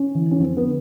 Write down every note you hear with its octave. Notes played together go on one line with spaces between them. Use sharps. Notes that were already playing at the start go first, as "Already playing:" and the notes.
Already playing: C#4
E3
C#4
F2 C4
B3
D3